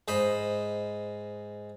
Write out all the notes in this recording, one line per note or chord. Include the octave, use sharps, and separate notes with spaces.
G#2 C5 D#5 B5